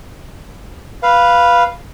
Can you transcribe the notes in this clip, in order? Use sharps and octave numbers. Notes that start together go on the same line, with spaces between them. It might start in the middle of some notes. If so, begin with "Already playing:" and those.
B4 F5